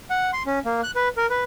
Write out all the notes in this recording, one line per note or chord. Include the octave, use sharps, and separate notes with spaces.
F#5
C6
C#4
A#3
F#6
B4
A#4
B4